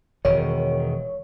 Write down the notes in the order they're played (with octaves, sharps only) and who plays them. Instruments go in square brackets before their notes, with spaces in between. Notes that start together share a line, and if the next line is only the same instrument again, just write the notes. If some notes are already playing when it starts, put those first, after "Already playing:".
[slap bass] E1 D#3 [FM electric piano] C#5